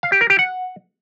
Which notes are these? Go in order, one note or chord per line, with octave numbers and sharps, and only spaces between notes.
F5
G4
A#4
G4
F#5